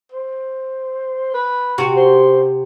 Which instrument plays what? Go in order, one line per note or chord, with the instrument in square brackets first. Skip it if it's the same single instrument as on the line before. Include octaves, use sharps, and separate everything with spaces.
[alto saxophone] C5
B4
[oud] C3 F#4
[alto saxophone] C5